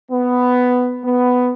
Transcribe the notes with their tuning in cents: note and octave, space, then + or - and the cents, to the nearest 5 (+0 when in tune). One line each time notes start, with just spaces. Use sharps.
B3 +10
B3 +10